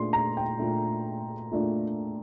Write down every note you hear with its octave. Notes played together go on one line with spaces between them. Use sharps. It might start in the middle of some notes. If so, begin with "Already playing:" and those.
Already playing: A#2 A3 D4 C6
A#5
G5
A#2 A3 D4
A#2 A3 D4